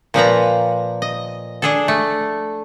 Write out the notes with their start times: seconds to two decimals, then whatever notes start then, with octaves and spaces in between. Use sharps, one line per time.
0.14 A#2 F3 B4 A#5
1.02 D#5
1.62 D4 G#4 A4
1.88 A3